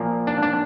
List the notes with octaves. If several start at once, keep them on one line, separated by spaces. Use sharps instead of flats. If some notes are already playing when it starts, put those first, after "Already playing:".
Already playing: A#2 F3 A#3
D4
D4